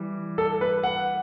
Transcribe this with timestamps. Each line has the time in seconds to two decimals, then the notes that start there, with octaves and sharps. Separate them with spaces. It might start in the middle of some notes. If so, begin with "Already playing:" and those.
Already playing: E3 G3
0.38 A4
0.61 B4
0.83 F#5